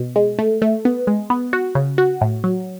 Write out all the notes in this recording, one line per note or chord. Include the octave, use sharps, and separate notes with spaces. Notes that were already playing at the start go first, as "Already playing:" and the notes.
Already playing: B2
G#3
A3
A3
B3
G#3
B3
F#4
C#3
F#4
A2
F#3